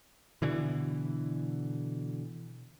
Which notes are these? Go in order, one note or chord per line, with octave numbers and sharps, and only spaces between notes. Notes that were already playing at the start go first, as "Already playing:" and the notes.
B2 D3 E3